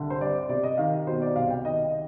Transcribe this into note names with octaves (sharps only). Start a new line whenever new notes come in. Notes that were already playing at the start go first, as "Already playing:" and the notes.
Already playing: C2 D3
C5
G2 D5
C3 D5
D#5
D#3 F5
B2 C5
D5
C2 F5
G5
D#3 D#5